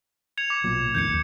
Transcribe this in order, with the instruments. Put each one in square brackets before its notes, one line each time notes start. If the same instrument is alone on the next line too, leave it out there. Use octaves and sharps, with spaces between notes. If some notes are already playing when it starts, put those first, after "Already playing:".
[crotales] G#6 C#7 F7
D6
[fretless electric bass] B1 A#2 F#3
[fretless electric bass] F2 A2 D#3 [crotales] G6 G#6 C#7
[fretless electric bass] D#2